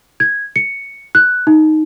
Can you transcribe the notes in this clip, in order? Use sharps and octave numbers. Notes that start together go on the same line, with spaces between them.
G#6
C#7
F#6
D#4